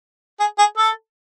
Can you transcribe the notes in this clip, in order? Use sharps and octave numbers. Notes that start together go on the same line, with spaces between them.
G#4
G#4
A4